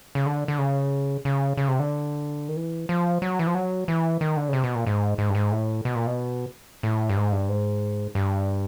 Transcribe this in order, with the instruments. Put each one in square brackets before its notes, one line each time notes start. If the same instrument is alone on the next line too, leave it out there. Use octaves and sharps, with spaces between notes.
[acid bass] C#3
D3
D3
C#3
C#3
C#3
C3
D3
D#3
E3
F3
F#3
E3
F3
F#3
E3
D#3
D3
C#3
C3
B2
A#2
G#2
G#2
G2
G#2
A2
B2
A#2
B2
A2
G2
G#2
G2
G#2
G2